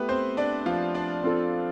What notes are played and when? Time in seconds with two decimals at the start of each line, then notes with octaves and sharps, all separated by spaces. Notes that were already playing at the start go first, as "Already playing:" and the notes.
Already playing: A3 B3 E4 G4 B4
0.09 C4 C5
0.37 D4 D5
0.66 F3 F4
0.94 D4 D5
1.23 C4 F4 A4